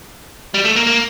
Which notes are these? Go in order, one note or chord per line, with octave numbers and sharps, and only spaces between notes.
G3
A3
A#3
A#3